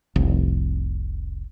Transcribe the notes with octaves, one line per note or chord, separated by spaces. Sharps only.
F1 C2